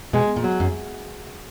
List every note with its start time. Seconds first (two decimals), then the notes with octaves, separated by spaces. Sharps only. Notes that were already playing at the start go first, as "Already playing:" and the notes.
0.13 B2 G#3
0.36 A#2
0.44 F#3
0.60 F#2